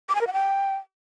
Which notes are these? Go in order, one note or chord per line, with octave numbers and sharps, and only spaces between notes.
D6
G#5
A#4
F#5
G5